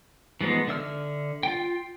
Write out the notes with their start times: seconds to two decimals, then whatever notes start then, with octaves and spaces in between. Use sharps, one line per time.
0.41 E3 F3 G#3 B3 D#4
0.67 D3 E5 E6 F6
1.43 F4 G5